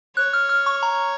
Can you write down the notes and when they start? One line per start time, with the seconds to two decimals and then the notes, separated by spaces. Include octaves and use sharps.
0.16 C#5 F#6
0.33 F6
0.49 F6
0.66 C#6
0.83 A#5